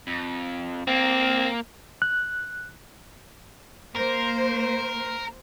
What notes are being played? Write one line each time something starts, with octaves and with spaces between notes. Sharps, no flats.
F2
A#3 C4
F#6
A#3 A#4 C5